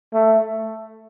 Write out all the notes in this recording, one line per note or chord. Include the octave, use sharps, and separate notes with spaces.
A3